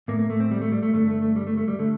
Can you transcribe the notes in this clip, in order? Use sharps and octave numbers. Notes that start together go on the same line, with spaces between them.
A2 A#3
A#3
A3
C4
G3
A3
G3
A3
G2 D3 A3
A3
A3
G3
A3
A3
G3
D3 A3